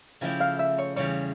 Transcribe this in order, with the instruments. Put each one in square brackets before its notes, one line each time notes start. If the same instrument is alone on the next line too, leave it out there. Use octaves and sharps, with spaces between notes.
[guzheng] C#3 F3 A3 E4 G4 [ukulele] G5
[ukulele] F5
E5
C#5
[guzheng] E2 C#3 G3 [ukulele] C#5